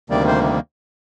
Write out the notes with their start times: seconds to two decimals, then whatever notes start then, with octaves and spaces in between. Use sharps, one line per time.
0.10 D2 C3 D#3 G3 A#3 D5
0.28 C5